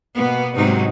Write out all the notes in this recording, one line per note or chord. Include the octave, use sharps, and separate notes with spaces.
B2 A#3 B3
G#2 C3 F#3 D#4